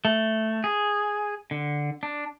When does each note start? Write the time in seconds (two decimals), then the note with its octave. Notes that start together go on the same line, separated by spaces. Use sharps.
0.05 A3
0.64 G#4
1.51 D3
2.03 D4